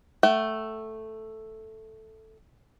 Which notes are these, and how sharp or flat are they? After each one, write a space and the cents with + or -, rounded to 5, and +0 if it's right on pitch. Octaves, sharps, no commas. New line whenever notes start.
A3 +0 F#5 +45